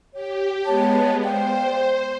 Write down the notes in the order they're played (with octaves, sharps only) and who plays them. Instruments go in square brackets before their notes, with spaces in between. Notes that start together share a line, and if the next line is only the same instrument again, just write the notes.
[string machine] G4 [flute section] C#5
[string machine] G#3 B3 [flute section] C#5 A5
[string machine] C5 [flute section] D5 F5 G5